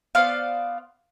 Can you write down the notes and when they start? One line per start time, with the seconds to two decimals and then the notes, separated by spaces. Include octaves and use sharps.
0.15 B3 C5 D5 F5